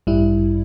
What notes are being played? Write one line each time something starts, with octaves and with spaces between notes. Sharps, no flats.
A1 G2 G3 E4